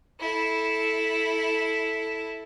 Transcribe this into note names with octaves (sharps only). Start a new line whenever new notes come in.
E4 A4